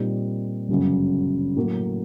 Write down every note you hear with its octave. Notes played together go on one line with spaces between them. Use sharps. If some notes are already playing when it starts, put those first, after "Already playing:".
Already playing: A#2 G3 C4 D#4
G1 F#2 C#3 F#3
A2 F#3 A#3